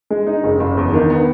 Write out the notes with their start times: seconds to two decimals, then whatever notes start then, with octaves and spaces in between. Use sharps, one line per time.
0.10 G#3
0.27 D#4
0.44 F#1
0.60 F#1
0.77 E2
0.93 D#3
1.10 B3